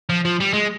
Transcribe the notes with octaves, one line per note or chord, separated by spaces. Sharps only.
F3
F3
G3
G#3